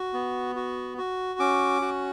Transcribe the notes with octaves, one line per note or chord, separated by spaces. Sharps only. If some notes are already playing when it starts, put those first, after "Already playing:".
Already playing: F#4
B3
F#4
F#4
C#4 D6
F#4